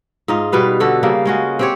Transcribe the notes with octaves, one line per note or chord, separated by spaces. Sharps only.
G#2 D#4 F4
B2 G3 B4 F5
D3 F#4 A4
C#3 G3 A#3
G#3 C#4 F#4
C4 G4 C#5